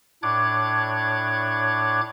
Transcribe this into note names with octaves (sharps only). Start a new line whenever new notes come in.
A2 D4 C#5 D6 F#6 G#6